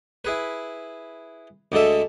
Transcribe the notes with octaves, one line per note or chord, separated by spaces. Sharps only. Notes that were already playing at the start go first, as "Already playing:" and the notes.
E4 G#4 B4
D2 D3 G#3 A4 E5